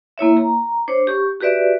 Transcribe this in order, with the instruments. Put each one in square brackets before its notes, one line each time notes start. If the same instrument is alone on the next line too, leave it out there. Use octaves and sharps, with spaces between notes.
[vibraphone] A#3 E4 C#5 E5
A#5
D4 C5 C#5
G4 C#6
F#4 G4 B4 D5 E5